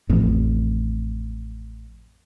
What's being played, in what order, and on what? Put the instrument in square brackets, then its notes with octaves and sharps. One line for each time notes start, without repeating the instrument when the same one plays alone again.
[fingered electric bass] A1 F2